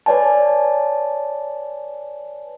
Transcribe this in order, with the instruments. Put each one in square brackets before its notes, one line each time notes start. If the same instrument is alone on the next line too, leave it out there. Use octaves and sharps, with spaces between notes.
[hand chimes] B4 C#5 D5 G#5 A5